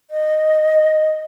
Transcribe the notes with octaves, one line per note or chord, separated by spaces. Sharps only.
D#5